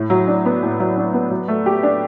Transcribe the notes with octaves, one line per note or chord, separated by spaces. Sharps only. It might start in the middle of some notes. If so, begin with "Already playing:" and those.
Already playing: A2
F#3
D4
B3
A2
F#3
D4
B3
F#3
A3
G4
D4